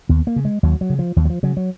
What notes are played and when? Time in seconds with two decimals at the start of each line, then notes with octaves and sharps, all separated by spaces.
0.09 D#2 B3
0.27 A#3
0.36 C#3
0.45 G#3
0.63 D#2 F#3
0.81 F#3
0.90 C#3
0.99 F3
1.16 D#2 F3
1.25 F#3
1.30 F3
1.43 C#3 F#3
1.57 F#3